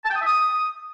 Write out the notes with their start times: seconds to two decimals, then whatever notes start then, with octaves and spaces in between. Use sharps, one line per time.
0.04 A5
0.10 G5
0.15 D#6
0.21 E5
0.26 D#6